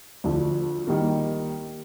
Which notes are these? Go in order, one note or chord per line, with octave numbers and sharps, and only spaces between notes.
D2 D3 F3
D#3 G3 A#3